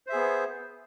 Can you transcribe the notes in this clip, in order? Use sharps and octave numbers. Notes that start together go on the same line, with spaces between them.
B3 G#4 C5 E5